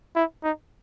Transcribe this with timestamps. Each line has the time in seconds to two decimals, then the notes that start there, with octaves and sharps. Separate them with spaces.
0.16 E4
0.43 D#4